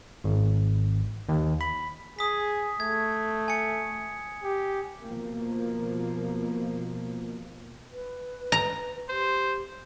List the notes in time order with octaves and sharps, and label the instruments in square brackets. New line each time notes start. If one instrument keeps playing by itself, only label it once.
[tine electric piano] G#1
D#2
B5
[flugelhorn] G#4 [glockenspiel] D#6 B6
[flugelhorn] A3 [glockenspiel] G#6
[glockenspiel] G#5 C#7
[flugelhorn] G4
[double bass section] B2 F3 A#3
[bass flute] B4
[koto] A#5
[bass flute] G4 [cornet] C5